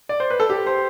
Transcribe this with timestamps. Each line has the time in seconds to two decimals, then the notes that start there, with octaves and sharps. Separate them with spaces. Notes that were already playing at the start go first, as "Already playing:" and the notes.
0.09 D5
0.20 C5
0.30 B4
0.40 A4
0.50 G4
0.67 C5